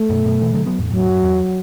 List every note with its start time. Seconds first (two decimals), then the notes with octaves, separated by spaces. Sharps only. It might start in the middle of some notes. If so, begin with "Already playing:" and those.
Already playing: A3
0.09 F#2 B2
0.25 F#2 B2
0.41 B2 E3
0.54 D3 F#3
0.66 F#3 B3
0.79 E2 A2
0.90 E2 A2 F#3
1.08 F#2
1.23 E2